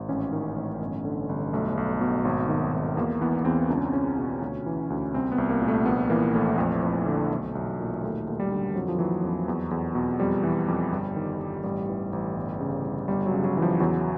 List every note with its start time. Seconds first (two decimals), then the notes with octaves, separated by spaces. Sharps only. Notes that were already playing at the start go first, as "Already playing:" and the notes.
Already playing: G#1
0.09 A1 C#4
0.32 D#3
0.56 A1
0.81 G1
1.05 D3
1.29 G1
1.53 B1 A3
1.77 B1
2.01 B2
2.25 G#1
2.49 D#3
2.73 G#1
2.97 E2 A#3
3.21 E3 B3
3.39 B3
3.45 E2 C4
3.69 C#2 D4
3.77 C#4
3.85 C4
3.93 C#2 C#4
4.18 B2
4.42 D2
4.66 E3
4.90 D2
5.14 C2 C4
5.32 B3
5.38 C2
5.50 A#3
5.62 A#2
5.68 A3
5.86 A#1 B3
6.10 E3 A#3
6.35 A#1 A3
6.58 F2 A3
6.82 F2
7.06 D3
7.31 B1
7.55 B1
7.79 A#2
8.03 D#2 A3
8.28 D#2
8.40 G3
8.51 D3
8.75 F2 F#3
8.88 F3
8.99 E3 F#3
9.24 F2
9.48 E2
9.71 E2
9.95 B2
10.19 F2 G3
10.43 E3
10.68 F2
10.92 G1
11.16 D#3
11.39 G1
11.64 A1 G3
11.89 E3
12.13 A1
12.36 G1
12.60 C#3
12.85 G1
13.08 G1 G3
13.26 F#3
13.32 C#3
13.44 F#3
13.57 E3
13.62 F3
13.80 E2 F#3